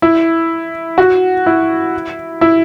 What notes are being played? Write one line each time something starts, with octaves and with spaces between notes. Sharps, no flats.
E4
F#4
E4
E4